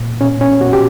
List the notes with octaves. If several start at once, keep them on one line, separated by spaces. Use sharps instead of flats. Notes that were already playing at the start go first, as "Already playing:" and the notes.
Already playing: A#2
B2 C#4
C#4
B2 F#4
G4